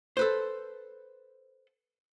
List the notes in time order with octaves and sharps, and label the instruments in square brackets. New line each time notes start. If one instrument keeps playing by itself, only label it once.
[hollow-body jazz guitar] A4 B4 C5